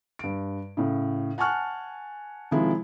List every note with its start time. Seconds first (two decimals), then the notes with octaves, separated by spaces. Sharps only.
0.19 G2 D7
0.77 A2 C#3
1.38 F#5 G#5 A5 C#6 F6 F#6
2.51 C3 D#3 F3 G#3 E4